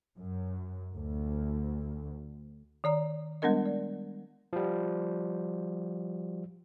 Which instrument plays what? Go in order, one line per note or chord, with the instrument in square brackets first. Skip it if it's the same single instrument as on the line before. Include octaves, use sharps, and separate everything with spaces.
[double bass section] F#2
D2
[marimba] D#3 D5 A#5
G3 G#3 B3 D4 A#4 D#5
D5
[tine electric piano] F3 G3